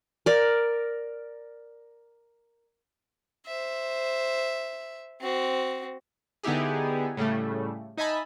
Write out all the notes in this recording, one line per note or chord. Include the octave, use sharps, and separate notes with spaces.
A#4 D5
C5 E5
C4 F#4
D3 B3 D#4 E4 G4 G#4
A2 C#3 G3 A3
D#4 D#5 E5 G#5 A5 B5